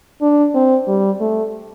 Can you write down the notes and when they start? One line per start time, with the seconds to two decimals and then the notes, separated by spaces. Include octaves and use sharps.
0.21 D4
0.54 C4
0.88 G3
1.20 A3